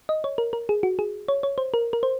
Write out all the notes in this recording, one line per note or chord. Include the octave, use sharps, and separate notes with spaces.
D#5
C#5
A#4
A#4
G#4
F#4
G#4
C#5
C#5
C5
A#4
A#4
C5